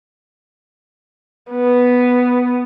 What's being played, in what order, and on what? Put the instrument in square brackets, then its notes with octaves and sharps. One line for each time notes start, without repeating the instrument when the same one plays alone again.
[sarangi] B3